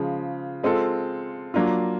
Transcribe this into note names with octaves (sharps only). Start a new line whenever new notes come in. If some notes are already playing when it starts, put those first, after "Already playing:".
Already playing: C#3 F3 G#3
G#3 C4 F4 A4
F#3 A#3 D4 F4